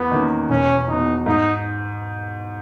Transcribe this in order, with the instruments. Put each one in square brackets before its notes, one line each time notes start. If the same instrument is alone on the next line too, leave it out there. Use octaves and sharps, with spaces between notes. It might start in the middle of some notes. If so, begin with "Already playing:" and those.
Already playing: [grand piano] E2 [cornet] B3
[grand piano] D#3 A#3 C#4
[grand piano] E1 [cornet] C#4
[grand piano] E2 B2 [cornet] D#4
[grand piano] G#2 [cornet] D#4